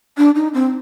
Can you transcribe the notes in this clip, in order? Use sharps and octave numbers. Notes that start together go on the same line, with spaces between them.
D4
D#4
C4